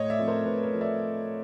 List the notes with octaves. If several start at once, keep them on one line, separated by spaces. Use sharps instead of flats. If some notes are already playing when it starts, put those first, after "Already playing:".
Already playing: A2 C#5 D#5
D5 E5
F3 A3 C4
A#4 C5
A2 B4
A#4
F3 A3 C4
D5 E5